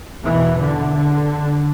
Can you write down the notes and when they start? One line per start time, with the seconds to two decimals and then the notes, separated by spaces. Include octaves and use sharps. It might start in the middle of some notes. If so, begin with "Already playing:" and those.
0.23 E2 B2 E3
0.60 D3
0.95 D3